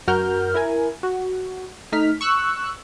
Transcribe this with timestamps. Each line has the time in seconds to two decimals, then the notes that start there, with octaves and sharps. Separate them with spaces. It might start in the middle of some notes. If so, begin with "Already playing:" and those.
0.07 F#2 F#4 A#4 F6 G6
0.54 E4 A#4 G#5
1.03 F#4
1.92 A3 D#4 F6 B6
2.21 C#6 E6 F#6